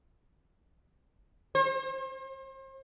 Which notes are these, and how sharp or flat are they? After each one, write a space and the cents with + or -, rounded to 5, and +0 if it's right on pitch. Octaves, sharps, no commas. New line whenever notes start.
C5 +40